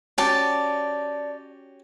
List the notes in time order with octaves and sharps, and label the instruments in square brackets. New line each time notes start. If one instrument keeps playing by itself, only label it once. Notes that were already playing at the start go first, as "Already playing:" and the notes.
[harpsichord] C#4 F#4 G4 [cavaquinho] D5 A5